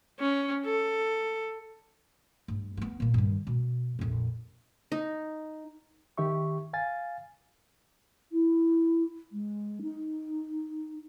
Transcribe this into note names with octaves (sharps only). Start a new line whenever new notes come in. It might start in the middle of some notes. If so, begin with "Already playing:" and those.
C#4
A4
G2
A#3 B3
A#2 A#3
G2 D#3
B2
A#1 F2
D#4
D#3 G4 E5 C#6
F5 G#5 A6
E4
G#3
D#4